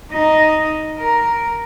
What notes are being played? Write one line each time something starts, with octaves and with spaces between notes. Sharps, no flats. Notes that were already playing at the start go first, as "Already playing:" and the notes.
D#4 D#5
A#4